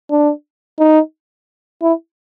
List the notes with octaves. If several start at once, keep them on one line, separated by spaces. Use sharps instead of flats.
D4
D#4
E4